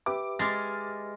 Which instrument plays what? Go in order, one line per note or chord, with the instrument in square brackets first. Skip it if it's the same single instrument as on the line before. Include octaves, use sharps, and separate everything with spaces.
[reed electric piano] G4 B4 E5 [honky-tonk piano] D6
[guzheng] G#3 [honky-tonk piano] F6 A6